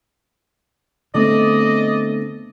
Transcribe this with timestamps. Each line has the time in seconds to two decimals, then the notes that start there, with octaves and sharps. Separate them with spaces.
1.14 D3 A3 B3 C4 D5 D#5